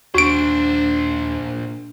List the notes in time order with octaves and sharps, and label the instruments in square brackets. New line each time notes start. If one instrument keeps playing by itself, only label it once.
[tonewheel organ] D#2 [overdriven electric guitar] A#2 C5 [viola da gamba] D4 [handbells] F#4 D7